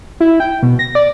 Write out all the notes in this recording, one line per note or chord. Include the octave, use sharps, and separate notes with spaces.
E4
G5
B2
A#6
D5